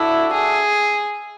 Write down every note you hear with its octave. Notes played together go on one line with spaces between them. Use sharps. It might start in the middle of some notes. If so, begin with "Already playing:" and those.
Already playing: D4 E4 F#4 A4 E5
G#4